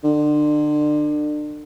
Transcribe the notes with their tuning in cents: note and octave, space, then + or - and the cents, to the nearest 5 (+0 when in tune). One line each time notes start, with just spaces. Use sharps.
D3 +35